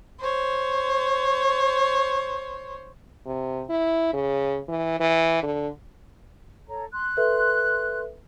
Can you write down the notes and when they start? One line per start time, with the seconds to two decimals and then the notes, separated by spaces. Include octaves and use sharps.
0.20 C5 C#5
3.26 C3
3.69 E4
4.13 C#3
4.68 E3
5.00 E3
5.43 D3
6.68 A4 C#5 A#5
6.92 C6 F#6
7.17 A4 B4 E5